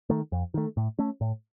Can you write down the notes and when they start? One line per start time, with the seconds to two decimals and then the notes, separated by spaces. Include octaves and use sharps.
0.10 D#3 A3
0.32 F2
0.54 D#3 A3
0.77 A2
0.99 A3 C#4
1.21 A2